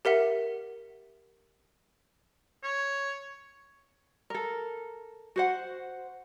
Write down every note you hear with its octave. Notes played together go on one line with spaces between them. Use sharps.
G4 A#4 E5 F#5
C#5
A4 A#4
F#4 C5 F#5